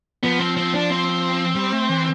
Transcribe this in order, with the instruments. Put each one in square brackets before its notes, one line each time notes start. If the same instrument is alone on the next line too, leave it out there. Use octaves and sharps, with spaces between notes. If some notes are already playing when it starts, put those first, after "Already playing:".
[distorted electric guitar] F3 [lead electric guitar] B3
[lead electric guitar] C4
C4
D4
C4
[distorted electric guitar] G3
A3
E3